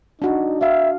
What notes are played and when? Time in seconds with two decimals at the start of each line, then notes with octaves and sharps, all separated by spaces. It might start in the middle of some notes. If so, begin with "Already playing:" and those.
0.22 D4 D#4 F#4
0.61 F#4 E5 F5